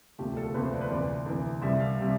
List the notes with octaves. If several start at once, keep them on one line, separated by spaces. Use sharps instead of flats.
E1 D2 C3 F3 A3 G4
A4
E1 D2 C3 F3 A3 B4
C5
D5
B4
D2 C3 E3 D5
D2 C3 E3
C2 C3 G3 E5
F5
C3 G3